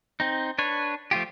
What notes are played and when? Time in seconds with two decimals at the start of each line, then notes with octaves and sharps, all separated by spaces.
0.20 C4 D#4
0.59 D4 B4 C#5
1.11 F3 A3 F4 G4